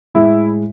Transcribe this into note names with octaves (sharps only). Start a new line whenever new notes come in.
A2 G#3 E4